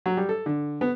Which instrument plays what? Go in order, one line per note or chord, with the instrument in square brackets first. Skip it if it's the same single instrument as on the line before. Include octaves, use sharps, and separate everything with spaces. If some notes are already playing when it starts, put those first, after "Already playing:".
[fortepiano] F#3
G3
A4
D3
B3